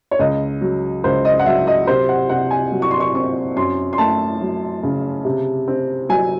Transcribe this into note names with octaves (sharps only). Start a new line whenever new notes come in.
C#5
C#2 D#5
F#3
C#2 C5
D#5
F#5
F#3 E5
D#5
C3 C5
F#5
C3 F#5
G#5
F#3
C#6
C6
C#6
C4 C#6
F#2 C6
C6
A3 A5
F#3
C#3
C3
C4
F#3 G#5